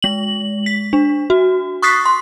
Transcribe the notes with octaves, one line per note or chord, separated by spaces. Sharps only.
G#3 F#7
B6
D4
F#4
C#6 D#6 F#6 A6 B6 C7
C6